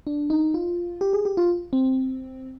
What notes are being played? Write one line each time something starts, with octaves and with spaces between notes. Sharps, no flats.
D4
D#4
F4
G4
G#4
G4
F4
C4